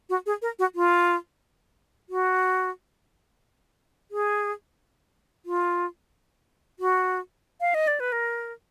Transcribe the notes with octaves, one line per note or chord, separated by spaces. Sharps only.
F#4
G#4
A#4
F#4
F4
F#4
G#4
F4
F#4
F5
D#5
D5
B4
A#4